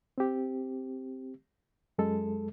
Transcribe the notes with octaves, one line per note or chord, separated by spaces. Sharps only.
C4 G4
F#2 G#3 A4